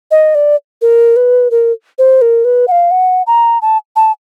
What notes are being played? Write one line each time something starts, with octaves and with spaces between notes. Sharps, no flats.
D#5
D5
A#4
B4
A#4
C5
A#4
B4
F#5
F5
F#5
A#5
A5
A5